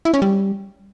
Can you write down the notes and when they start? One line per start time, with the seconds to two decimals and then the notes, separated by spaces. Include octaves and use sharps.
0.05 E4
0.14 C#4
0.22 G3